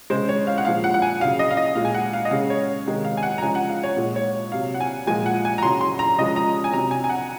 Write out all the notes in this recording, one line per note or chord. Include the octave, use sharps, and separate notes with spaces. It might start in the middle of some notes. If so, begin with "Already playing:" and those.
C#3 G#3 C5
C#5
F5
F#5
A#2 F3 G#3 F5
F#5
F#5
G#5
C#3 F#3 F5
D#5
F5
D#5
A#2 G#3 F5
G#5
F#5
F5
D#5
C#3 G#3 F5
C#5
C3 D#3 G#3
F5
G#5
F#5
A#5
C#3 F3 G#3 G#5
F#5
F5
C#5
A#2 G#3
C#5
C3 F#3 F5
F#5
G#5
A#2 F3 G#3 G#5
F#5
G#5
A#5
C#3 F#3 C6
C6
A#5
C#3 F3 G#3 D#5
A#5
G#5
C3 F#3 A#5
G#5
G#5
F#5